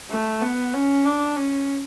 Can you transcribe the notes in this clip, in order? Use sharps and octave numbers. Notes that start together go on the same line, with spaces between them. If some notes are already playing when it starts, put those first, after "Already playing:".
A3
B3
C#4
D4
C#4